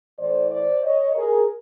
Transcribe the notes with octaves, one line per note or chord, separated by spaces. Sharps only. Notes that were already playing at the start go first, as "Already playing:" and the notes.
A2 E3 A3 C5 D5
C5 D5
C#5 D#5
G#4 A#4